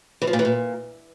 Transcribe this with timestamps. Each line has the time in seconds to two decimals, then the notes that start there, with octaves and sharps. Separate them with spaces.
0.22 E3
0.27 F3
0.33 A#2
0.39 E3
0.45 A#2